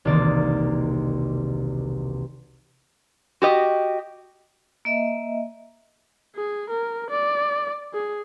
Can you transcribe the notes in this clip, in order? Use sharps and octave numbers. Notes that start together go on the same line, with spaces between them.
E1 C2 D#3 A#3 D5
F#4 G4 D#5
A#3 D#5 E5
G#4
A#4
D5
G#4